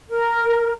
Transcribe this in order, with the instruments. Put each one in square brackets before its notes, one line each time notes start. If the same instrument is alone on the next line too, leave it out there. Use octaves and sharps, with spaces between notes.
[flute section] A#4